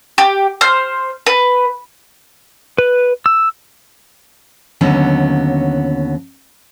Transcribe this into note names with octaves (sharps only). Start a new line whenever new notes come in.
G4
C5 F6
B4
B4
E6
D#2 D3 F#3 B3 C#4